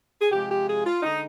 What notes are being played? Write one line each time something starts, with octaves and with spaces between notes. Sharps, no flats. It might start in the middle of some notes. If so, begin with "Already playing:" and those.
G#4
C3 F3 G#3 G4
G4
G#4
F4
D3 G#3 D#4